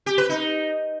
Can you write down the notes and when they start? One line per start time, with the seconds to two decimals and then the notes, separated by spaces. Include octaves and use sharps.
0.06 G4
0.18 B4
0.29 D#4